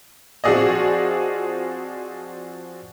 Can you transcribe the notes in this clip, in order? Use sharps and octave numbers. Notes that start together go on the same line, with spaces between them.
F3 C4 F#4 G#4 D5 D#5